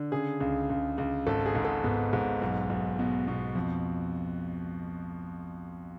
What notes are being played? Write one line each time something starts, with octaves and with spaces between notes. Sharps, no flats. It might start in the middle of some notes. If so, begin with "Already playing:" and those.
Already playing: D3
C#3 G#4
C#2
C#2
C#2
G#1 A4
G#4
G#2
A4
G#2 B3
G#2
B1
B1
B2
B2
F2